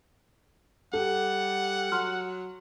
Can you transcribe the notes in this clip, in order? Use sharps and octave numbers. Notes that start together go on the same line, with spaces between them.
G3 G4 A4 F#5
F#3 C6 F6